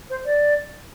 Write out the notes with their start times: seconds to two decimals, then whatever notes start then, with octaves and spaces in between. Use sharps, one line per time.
0.10 C5
0.25 D5